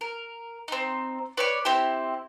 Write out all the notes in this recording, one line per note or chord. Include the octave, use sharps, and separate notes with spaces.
A#4
C4 D#4
B4 C#5 D5
C4 E4 G4